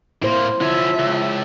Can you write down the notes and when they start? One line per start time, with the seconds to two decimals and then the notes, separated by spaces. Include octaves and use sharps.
0.22 A2 A#3 E4 C5
0.61 D3 F3 C#4 E4 E5
0.99 C#2